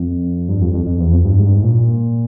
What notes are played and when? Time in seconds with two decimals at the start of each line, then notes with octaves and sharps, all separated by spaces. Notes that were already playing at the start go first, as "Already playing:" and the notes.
Already playing: F2
0.49 G2
0.61 F2
0.74 F2
0.87 F2
1.00 E2
1.12 F2
1.25 G2
1.38 G#2
1.45 G2
1.55 G#2
1.64 A#2